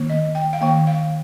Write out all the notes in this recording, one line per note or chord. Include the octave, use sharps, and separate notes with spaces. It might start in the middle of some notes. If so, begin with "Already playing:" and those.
Already playing: D#3 A#3
D#5
G5
F5
D#3 A#3 G5
F5